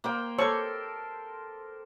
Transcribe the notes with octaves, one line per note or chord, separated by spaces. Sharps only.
A#3 C5 G5
A4 A#4 C5 C#5 C6 C#6